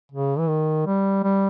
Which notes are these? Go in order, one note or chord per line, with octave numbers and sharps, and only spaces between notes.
C#3
E3
D#3
G3
G3